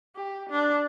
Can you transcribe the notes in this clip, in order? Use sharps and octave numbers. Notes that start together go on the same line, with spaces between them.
G4
D4